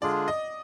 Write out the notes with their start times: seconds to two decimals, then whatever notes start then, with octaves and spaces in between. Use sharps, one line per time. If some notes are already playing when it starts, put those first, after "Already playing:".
0.02 D3 G#3 D4 F4 G#4 D5
0.28 D#5